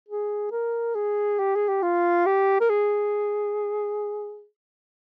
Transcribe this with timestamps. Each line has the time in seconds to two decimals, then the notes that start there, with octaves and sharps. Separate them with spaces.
0.08 G#4
0.52 A#4
0.95 G#4
1.39 G4
1.55 G#4
1.68 G4
1.83 F4
2.26 G4
2.60 A#4
2.70 G#4